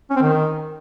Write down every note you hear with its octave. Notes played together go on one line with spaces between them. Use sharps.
C#4
C4
D#3